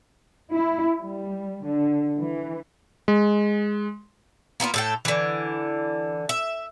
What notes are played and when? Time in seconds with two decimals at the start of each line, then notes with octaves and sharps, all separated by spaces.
0.52 E4
0.98 G3
1.65 D3
2.19 E3
3.08 G#3
4.60 A#3 B3 E4 F4
4.74 A2 A4 G5
5.05 D3 E3
6.29 E5